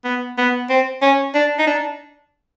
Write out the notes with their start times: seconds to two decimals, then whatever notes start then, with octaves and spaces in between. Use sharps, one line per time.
0.04 B3
0.38 B3
0.70 C4
1.02 C#4
1.35 D4
1.59 D#4
1.67 D4